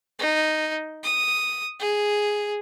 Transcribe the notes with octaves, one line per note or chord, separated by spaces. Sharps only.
D#4
D#6
G#4